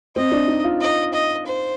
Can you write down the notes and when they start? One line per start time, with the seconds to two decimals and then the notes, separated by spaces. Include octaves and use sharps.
0.16 C4 D#5
0.32 D4
0.48 D#4
0.64 F4
0.81 D#5
1.13 D#5
1.46 C5